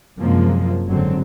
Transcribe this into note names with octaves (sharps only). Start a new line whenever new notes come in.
F#2 C3 F3 G#3 A#3
F#1 G#2 D3 F#3 C4